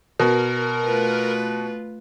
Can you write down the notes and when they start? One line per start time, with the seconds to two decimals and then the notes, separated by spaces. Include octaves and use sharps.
0.19 B2 A#4
0.85 A3 F4 B4